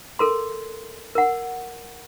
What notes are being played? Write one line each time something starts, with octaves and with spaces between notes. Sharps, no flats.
A4 A#4 C6
A#4 F#5